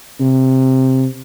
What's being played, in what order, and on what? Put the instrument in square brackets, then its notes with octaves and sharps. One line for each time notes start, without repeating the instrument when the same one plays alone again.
[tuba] C3